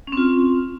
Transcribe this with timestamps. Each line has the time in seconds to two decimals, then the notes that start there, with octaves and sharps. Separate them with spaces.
0.07 C#4
0.12 C4
0.17 F4